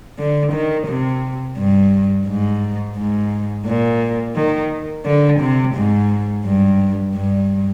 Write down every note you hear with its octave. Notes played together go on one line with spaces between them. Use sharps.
D3
D#3
C3
G2
G#2
G#2
A#2
D#3
D3
C3
G#2
G2
G2